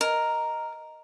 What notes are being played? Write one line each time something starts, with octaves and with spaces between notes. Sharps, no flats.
A#4 D#5 A#5